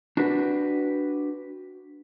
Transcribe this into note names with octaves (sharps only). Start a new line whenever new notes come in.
D4 F#4 G4 B4